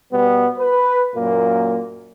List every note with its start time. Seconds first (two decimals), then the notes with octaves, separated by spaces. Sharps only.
0.12 B2 G3 B3
0.58 B4
1.15 F#2 A#2 A#3